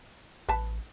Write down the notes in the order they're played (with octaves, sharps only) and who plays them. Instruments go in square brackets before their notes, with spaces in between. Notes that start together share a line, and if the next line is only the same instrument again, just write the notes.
[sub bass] A1 [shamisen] B4 A5